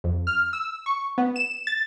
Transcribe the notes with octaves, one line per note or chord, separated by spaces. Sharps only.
F2
F6
E6
C#6
B3
E7
A6